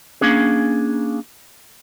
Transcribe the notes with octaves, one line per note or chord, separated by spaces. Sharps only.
A#3 C#4 D4 G#4